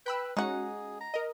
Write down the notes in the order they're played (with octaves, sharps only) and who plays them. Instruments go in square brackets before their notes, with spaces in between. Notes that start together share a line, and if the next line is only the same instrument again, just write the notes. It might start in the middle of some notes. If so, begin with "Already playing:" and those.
[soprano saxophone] B4 [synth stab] G5 B5 E6
[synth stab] G#3 C#4 F#4 [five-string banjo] D#4 F#5 [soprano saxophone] G#4
[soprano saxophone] A#5
[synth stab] A#4 D#5